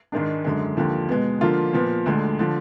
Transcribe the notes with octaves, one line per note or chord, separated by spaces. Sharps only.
G#2 D#3 G#3 D4
F#2 D3 G#3
D#2 D3 F3
B2 G#3 B3
D3 F3 A#3 F4
A#2 F3 B3
D2 D3 G#3
D3 F3